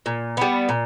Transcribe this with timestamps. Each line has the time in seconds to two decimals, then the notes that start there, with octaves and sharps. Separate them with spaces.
0.06 A#2
0.37 G3 B3
0.69 A#2